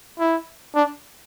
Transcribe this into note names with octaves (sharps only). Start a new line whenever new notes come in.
E4
D4